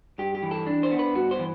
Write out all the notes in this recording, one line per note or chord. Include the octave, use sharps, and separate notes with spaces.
G2 G4
G4
E3
A4
D4
C5
B3
B4
G2 F#4
C5
E3